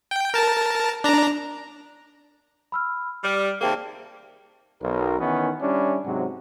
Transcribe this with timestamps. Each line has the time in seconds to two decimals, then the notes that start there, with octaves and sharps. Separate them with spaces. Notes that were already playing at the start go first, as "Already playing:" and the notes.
0.11 G5
0.34 A#4 A5
1.04 D4 A#5
2.72 B5 E6 F6
3.24 G3 D5 F6
3.61 D#2 C3 A#3 G#4 G5 A5
4.81 B1 A#4
5.19 D#3 E3 B3 C#4
5.61 G3 C#4 D4 E4
6.04 G#2 C3 F#3